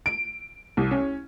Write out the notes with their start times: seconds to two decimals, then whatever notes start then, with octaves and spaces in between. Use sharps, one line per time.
0.06 D7
0.77 C2
0.91 C#4